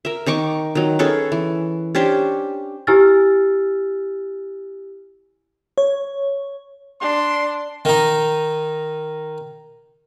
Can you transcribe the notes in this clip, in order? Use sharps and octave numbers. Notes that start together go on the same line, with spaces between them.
A#4 E5
D#3 D#4 C#6 D6
D#3 F#3
C#4 G#4 A4 B4
E3
C#4 D4 G4 C5
E4 G4 G#5 E6 F6 A6
C#5
D4 C6
D#3 D#4